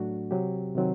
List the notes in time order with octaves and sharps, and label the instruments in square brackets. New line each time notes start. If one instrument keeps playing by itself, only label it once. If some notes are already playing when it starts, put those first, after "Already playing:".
Already playing: [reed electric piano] A2 F#3 A3 D4 F#4
C3 F#3 C4 G4
C3 D#3 F#3 C4